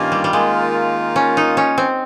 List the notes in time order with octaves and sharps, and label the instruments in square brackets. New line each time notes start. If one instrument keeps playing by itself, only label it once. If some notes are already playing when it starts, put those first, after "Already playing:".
Already playing: [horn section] G2 D#3 A#3 F4 [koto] C#4
[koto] G3
G3
[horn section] D#3 A#3 F4 [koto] G#3
[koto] C#4
D#4
C#4
C4